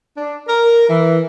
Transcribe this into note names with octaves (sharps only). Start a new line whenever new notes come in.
D4
A#4
E3